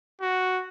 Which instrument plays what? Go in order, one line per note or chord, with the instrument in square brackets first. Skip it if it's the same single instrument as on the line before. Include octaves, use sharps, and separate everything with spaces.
[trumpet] F#4